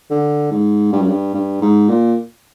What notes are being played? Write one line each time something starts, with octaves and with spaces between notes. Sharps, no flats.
D3
G#2
G2
F#2
G2
G2
G#2
A#2